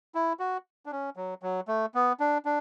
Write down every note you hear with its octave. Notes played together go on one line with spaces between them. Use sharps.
E4
F#4
D4
C#4
F#3
F#3
A3
B3
D4
D4